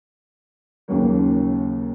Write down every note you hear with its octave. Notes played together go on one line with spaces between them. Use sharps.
D#2 C#3 F#3 A#3